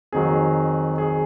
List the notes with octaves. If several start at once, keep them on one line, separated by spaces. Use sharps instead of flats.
F2 D#3 F#3 G#4
G#4